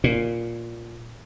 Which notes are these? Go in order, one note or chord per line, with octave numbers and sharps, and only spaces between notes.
A#2